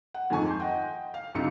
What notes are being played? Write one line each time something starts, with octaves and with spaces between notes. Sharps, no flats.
F#5
F2 G#2 D#3 G#5 A5 C#6
C6 G6
D#5 F#5 G5
F5
C2 D3 C4 D#4 F4 C#7